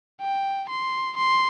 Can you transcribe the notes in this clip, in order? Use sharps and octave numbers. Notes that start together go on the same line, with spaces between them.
G5
C6
C6